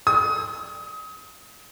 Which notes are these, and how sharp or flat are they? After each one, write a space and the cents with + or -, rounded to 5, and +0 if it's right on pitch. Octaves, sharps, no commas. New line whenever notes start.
D#6 +30